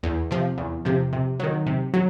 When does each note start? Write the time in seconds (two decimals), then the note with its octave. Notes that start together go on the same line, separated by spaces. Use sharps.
0.03 E2
0.31 C3 F3
0.58 E2
0.85 C3 F3
1.13 C3
1.40 D#3 F#3
1.67 C3
1.94 F#3